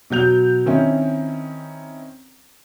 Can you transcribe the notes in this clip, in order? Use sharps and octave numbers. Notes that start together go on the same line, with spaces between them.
B2 F#3 G6 F7
D#3 C4 C#4 E4